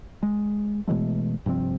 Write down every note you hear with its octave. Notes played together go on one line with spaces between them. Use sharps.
G#3
B2 E3 G#3 A3
G2 C3 F3 C4